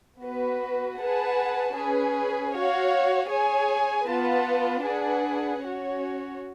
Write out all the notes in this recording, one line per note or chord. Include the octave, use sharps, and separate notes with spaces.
B3 F#4 B4
G#4 B4 F#5 A5
C#4 G#4 B4
F#4 C#5 F5
G#4 C#5 G#5
B3 F4 B4 F#5 A5
D4 G#4 B4 F#5
C#4 F#4 C#5